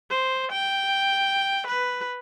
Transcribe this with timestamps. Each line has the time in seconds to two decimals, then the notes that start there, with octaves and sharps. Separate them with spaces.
0.10 C5
0.52 G5
1.67 B4